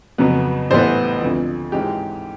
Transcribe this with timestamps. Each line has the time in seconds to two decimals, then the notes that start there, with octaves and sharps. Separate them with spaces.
0.18 F2 C#3 F#3 B3
0.70 A1 A2 E3 G3 B3 C5
1.21 D2 C3 F3
1.72 G#2 E3 G#3 C#4 G4